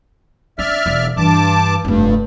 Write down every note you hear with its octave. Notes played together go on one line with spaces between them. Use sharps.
D4 D5 E5 F6
E1
G2 E3 A5 D6
F1 G2 A3